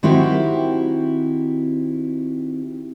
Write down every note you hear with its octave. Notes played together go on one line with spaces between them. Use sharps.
D#3 C4 E4 F#4 G4